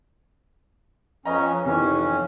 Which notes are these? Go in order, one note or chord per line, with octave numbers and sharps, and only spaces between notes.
F2 C#4 B4 D#5 A#5
F2 C3 D#3 E3 C#4